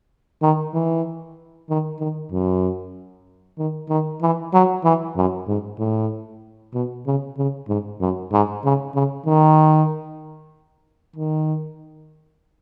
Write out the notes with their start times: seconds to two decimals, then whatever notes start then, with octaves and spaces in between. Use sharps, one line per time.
0.42 D#3
0.74 E3
1.69 D#3
2.00 D#3
2.32 F#2
3.58 D#3
3.89 D#3
4.22 E3
4.53 F#3
4.84 E3
5.17 F#2
5.48 G#2
5.79 A2
6.74 B2
7.06 C#3
7.38 C#3
7.68 G#2
8.01 F#2
8.32 G#2
8.64 C#3
8.95 C#3
9.26 D#3
11.16 D#3